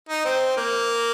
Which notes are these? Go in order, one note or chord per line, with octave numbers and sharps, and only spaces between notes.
D#4
C4
A#3